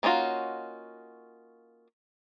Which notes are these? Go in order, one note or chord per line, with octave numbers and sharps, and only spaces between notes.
A#3 C#4 D#4 F4 F#4